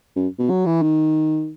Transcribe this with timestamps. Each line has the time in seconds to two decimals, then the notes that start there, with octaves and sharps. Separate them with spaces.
0.16 F#2
0.39 B2
0.50 F#3
0.66 E3
0.82 D#3